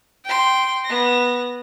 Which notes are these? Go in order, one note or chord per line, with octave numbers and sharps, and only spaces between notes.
G5 C6
B3 A#6